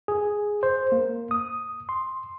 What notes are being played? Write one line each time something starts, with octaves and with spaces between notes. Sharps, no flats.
G#4
C5
A#3
D#6
C6